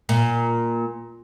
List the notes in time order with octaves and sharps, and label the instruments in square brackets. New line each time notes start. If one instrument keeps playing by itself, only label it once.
[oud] A#2